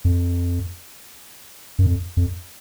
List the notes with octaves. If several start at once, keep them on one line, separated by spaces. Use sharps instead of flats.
F2
F#2
F2
F2